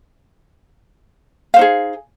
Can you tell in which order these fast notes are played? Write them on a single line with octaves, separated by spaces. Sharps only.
F5 C5 D#4 G#4